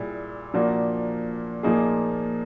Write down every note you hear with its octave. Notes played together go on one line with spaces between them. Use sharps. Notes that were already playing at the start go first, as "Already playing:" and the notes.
Already playing: A#2 G3 E4 G#4
A#2 F3 A#3 D4 F#4
A#2 F3 A#3 D#4 G#4